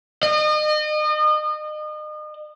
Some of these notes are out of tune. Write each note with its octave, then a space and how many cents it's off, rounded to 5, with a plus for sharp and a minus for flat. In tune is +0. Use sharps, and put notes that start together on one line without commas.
D#5 -35